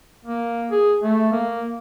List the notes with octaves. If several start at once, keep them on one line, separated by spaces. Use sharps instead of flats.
A#3
G#4
A3
A#3